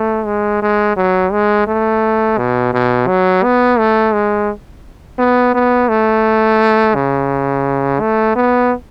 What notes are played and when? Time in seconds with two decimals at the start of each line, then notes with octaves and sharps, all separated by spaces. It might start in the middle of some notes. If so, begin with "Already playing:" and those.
Already playing: A3
0.26 G#3
0.62 G#3
0.97 F#3
1.32 G#3
1.67 A3
2.38 B2
2.73 B2
3.08 F#3
3.44 B3
3.79 A3
4.14 G#3
5.19 B3
5.55 B3
5.89 A3
6.95 C#3
8.00 A3
8.36 B3